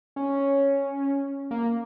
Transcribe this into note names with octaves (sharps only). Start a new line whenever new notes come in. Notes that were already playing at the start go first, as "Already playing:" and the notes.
C#4
A#3